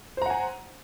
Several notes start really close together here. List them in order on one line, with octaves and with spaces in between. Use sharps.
C5 A#5 F#5 G#5